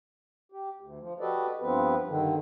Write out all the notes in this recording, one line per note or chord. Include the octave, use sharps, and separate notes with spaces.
G4
D2
F3
F#4 G4 A4 B4 D5 D#5
G2 F3 B3 C4 B4
G2 D3 D#3